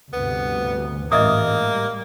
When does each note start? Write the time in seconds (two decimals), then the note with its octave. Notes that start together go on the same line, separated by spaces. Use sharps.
0.13 D2 G2 C3 B3
1.12 A1 G#2 A#3 D#5 E5 D#6
1.68 G3